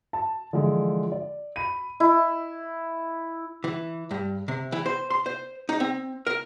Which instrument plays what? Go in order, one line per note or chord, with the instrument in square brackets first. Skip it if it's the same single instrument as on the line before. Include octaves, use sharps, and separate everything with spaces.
[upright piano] A5
D3 E3 F3 G#3
D5
B5 D#7
[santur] E4
[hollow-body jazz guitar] E3
G2
C3
E3
C5
C6
C5
D#4
C4
A#4